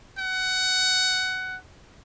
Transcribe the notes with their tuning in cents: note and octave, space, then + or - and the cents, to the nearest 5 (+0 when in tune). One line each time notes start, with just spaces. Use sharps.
F#5 +15